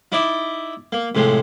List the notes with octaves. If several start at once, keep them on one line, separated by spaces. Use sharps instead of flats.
D#4 E4 D5 E5
A#3
A2 C3 F3 G#3